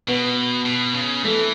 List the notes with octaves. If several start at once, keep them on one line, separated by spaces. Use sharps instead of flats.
B2 B3 B4
B2
C#3
E3 A3 A4